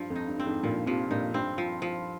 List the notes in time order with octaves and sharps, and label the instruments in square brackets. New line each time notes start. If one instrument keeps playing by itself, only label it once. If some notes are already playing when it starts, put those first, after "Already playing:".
Already playing: [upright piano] G2 [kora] F3
[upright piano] F2
[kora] D#4
[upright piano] G2
[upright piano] G2 [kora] C4
[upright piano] F2 G#2
[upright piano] G2 A#2 [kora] F3
[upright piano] G#2 C3 [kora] F3
[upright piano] G2 A#2 [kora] D#4
[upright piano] G2 [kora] C4
[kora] F3
F3